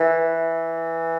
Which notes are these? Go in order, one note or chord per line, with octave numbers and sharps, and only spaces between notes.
E3